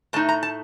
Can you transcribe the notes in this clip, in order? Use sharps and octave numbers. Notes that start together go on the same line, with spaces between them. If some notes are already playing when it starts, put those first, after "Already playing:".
A2 A3 D#4 A5
A#5
A5